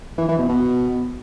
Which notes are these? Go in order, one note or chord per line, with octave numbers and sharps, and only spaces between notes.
E3
E3
B2
B2